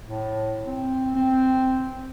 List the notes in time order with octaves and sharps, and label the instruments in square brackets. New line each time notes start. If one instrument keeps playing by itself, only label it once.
[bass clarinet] A2
C4
C4